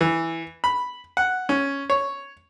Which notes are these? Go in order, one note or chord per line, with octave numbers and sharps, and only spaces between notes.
E3
B5
F#5
C#4
C#5